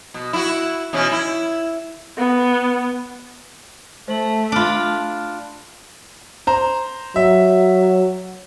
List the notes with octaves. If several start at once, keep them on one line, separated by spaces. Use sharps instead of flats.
B2
E4 F#4
B2 E3 C#4
E4
B3
A3 C5 F#7
D4 F4 B5 F6 D7
C5 A#5
F#3 E5